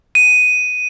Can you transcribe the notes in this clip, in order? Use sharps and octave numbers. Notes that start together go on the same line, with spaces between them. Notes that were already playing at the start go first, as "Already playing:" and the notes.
D#7